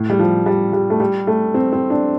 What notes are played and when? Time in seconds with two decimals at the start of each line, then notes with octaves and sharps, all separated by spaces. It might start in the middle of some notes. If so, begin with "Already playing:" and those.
Already playing: A2
0.10 G3
0.19 F3
0.46 G3
0.73 G3
0.90 A3
1.00 G3
1.27 A3
1.54 C4
1.73 C4
1.90 D4